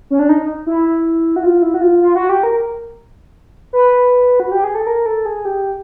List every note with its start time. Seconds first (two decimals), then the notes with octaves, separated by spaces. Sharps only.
0.10 C#4
0.19 D4
0.29 D#4
0.66 E4
1.36 F#4
1.43 F4
1.63 E4
1.74 F#4
1.81 F4
2.01 F4
2.16 F#4
2.29 G4
2.43 A#4
3.73 B4
4.40 F#4
4.52 G4
4.64 G#4
4.75 A4
4.87 A#4
5.06 A4
5.26 G#4
5.45 G4